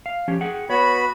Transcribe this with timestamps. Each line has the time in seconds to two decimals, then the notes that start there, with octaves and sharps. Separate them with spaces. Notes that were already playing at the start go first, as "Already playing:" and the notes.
0.06 F5
0.28 F3 C#4 G4
0.41 G#4 F#5 G5
0.70 B3 F#4 C#5 B5